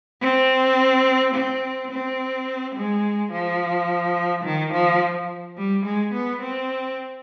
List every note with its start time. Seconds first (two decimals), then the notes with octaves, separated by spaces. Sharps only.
0.21 C4
1.34 C4
1.91 C4
2.75 G#3
3.32 F3
4.44 D#3
4.73 F3
5.57 G3
5.85 G#3
6.13 B3
6.42 C4